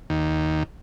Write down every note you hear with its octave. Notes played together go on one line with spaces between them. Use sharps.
D#2